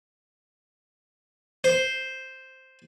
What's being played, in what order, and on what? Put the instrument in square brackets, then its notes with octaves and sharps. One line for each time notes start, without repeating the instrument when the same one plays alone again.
[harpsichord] C5